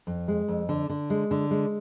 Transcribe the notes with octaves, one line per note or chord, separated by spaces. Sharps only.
F2
G#3
F2
D3
D3
G#3
D3
G#3